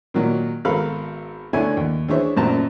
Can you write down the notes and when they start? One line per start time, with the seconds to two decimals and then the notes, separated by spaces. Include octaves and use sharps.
0.14 A#2 D#3 F#3
0.65 G#1 B3 A4 A#4 F5 B5
1.53 D2 D3 A3 E4 C#5 G#5
1.77 D#2
2.08 E3 D4 G#4 C5 C#5 E5
2.36 A1 F#2 A#2 C5 A5 A#5